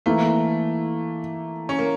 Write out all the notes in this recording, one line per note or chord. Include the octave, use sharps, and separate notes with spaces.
E3 A3 A#3 E4
C#4
A#3